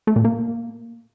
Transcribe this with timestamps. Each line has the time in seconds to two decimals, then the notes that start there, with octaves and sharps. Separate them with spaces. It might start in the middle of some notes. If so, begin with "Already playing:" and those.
0.07 A3
0.16 A#2
0.25 A#3